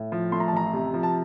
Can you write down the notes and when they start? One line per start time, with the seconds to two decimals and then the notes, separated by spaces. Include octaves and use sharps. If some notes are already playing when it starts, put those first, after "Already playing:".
Already playing: A2
0.12 F3
0.32 A3 C6
0.40 A#5
0.48 A5
0.53 A1 A#5
0.73 C3
0.94 F3
1.03 A5